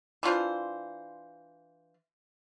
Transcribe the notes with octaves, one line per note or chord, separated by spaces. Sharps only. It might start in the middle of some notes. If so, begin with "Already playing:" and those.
E3 D4 F4 C5